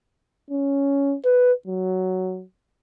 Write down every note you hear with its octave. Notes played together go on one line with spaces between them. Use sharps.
C#4
B4
F#3